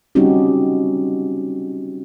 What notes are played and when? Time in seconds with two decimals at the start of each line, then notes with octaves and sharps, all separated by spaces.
0.15 G3 C4 C#4 D#4 F#4 G4